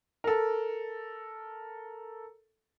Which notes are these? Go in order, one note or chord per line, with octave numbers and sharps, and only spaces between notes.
A4 A#4